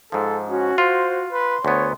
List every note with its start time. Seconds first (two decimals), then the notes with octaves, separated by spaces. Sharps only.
0.12 G#2 F3 A4
0.49 C#4 F#4
0.78 F4 C5
1.32 B4 C6
1.65 D2 B3 C#5